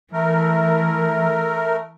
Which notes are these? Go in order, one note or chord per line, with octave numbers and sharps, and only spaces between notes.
E3 A3 A#4